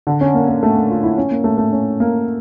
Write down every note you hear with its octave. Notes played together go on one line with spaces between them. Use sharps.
D3
C#4
A#3
A#3
A3
A#3
F4
E4
C#4
A#3
A3
A3
C#4
A#3